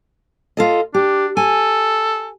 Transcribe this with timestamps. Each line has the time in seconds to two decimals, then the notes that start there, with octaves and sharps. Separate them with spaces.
0.57 F4 A4 D#5
0.94 D4 G4
1.37 A4 G#5